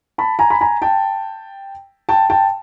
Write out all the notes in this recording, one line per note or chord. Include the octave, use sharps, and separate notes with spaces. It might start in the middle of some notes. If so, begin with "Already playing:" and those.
A5 B5
G#5 A#5
B5
G#5 A#5
G5 A5
G5 A5
G5 A5